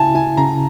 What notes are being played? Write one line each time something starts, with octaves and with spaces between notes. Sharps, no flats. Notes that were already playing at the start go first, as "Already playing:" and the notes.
Already playing: C#3 E4 G#5 A5
E4 G#5
C#3 A#5